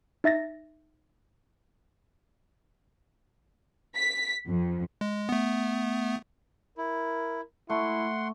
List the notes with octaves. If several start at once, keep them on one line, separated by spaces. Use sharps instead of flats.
D#4 E5 A6 A#6
B6
F2
G#3
A3 B3
E4 A#4
A3 E4 F#5 C6